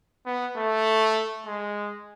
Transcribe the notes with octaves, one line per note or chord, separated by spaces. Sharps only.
B3
A3
G#3